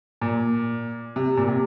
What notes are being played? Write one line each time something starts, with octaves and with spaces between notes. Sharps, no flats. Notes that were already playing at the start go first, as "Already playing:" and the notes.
A#2
C3
A#2
C3